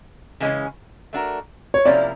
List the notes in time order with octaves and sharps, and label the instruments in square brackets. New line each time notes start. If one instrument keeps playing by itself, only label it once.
[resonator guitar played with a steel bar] C#3 E3 G#3 C#4
A3 D4 F#4 A#4
[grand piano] C#5
[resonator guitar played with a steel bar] C3 F3 A#3 C#4 E4 [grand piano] D5